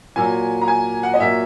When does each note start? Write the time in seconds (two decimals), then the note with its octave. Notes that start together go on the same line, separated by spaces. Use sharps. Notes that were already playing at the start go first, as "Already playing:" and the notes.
0.16 A#2 F#3 G#5
0.61 A#5
0.68 G#5
1.03 F#5
1.14 D#5
1.20 A#2 F#3 E5